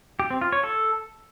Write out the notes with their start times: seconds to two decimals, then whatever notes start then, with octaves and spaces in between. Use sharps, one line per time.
0.20 G4
0.31 C4
0.42 F4
0.53 C#5
0.63 A4